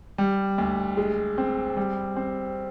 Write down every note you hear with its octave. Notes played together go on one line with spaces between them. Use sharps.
G3
D2
G#3
C4
G3
C4